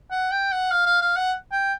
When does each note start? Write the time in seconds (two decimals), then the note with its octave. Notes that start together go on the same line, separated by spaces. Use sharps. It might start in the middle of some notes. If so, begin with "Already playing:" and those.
0.11 F#5
0.31 G5
0.52 F#5
0.71 F5
0.86 F5
1.01 F5
1.16 F#5
1.52 G5